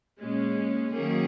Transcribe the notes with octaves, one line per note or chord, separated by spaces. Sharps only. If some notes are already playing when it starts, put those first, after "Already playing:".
A#2 G#3 C#4
D#3 F#3 A#3 C#4 G#4